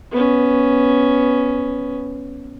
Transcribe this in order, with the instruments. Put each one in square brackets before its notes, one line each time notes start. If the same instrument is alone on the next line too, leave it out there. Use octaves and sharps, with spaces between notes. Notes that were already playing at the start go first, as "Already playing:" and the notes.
[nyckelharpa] B3 C#4